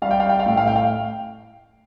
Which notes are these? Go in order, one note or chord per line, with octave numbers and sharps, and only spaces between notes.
G3 F5
G5
F5
G5
F5
A2 G5
F5
G5
F5